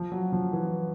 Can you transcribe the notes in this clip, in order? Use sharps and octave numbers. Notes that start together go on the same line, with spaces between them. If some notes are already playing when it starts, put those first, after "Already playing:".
Already playing: F3
F#3
F3
E3